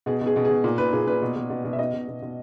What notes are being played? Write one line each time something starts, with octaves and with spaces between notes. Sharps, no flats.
B2 G#4
B2
G#4
B2
G#4
B2
A#2
A#2 B4
A#2 G#4
A#2 B4
B2
B2
B2
B2
E5
B2 D#5
B2
B2
B2